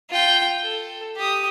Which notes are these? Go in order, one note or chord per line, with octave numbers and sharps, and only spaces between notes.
F4 G5
A4
G4 D#6